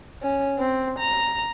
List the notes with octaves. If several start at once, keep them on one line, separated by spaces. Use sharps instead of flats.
C#4
C4
A#5